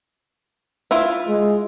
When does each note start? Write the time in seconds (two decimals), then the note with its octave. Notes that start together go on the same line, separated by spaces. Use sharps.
0.91 E4 F4 E5
1.28 G#3